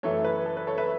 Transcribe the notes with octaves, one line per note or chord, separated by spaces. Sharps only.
F#2 E3 A3 A4 C#5
B4
A4
B4
A4 C#5
B4 E5